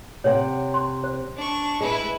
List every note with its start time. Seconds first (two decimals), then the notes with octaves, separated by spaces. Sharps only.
0.24 C3 C#5 F#5
0.74 C6
1.04 C5
1.37 D4 C#6
1.81 G#3 E4 B4